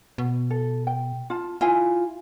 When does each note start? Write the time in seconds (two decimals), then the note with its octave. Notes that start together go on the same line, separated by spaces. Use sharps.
0.18 B2
0.50 A4
0.87 G5
1.30 F4 A5
1.61 E4 F4 G#5